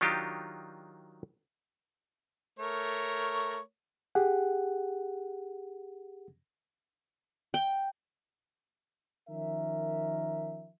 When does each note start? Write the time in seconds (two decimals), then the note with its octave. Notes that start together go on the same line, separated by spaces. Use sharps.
0.01 D#3 F#3 D4 D#4 F4 G4
2.59 A3 A#4 C#5
4.15 G4 G#4 F#5
7.54 G5
9.29 D#3 F3 C#4 A#4 E5